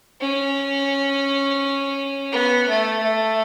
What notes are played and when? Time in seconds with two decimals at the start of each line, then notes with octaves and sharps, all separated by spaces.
0.21 C#4
2.32 B3
2.69 A3
3.03 A3